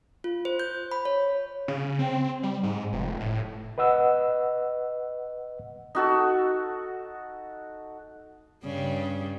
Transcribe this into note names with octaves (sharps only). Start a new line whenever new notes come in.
F4
C5
G6
B5
C#5
C#3
C4
G3
G#2
F1
A2
B4 D#5 F#5 E6
D#4 F#4 A4
G2 C#3 G3